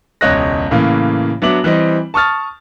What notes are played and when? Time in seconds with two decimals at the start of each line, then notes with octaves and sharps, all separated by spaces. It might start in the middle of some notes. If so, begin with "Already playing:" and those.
0.21 E1 C#2 C#5 D#5 F#6 A#6
0.71 A2 C#3 E3 A#3
1.42 F#3 B3 D4 E5 D6 F#7
1.64 E3 G3 C4 D#5
2.14 A5 C#6 D#6 F6 A6